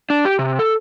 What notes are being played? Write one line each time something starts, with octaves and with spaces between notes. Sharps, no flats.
D4
G4
C3
A4